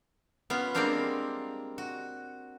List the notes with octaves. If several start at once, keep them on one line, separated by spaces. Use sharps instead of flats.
B3 C#4 F4
G3 G#3 A#3 C4 D4 F5
F#4